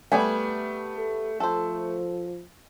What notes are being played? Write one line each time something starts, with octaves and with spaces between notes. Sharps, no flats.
G3 A3 B3 G#5
A4
F3 A4 C5